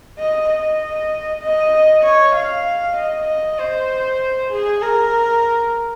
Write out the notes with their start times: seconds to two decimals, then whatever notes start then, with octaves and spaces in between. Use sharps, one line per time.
0.19 D#5
0.50 D#5
1.42 D#5
2.04 C#5
2.35 F5
2.96 D#5
3.27 D#5
3.59 C5
4.51 G#4
4.82 A#4